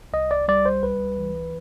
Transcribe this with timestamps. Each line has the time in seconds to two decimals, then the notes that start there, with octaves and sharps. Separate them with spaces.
0.13 C2 D#5
0.31 D5
0.48 G3 D5
0.66 C5
0.83 C#2 B4
1.18 E3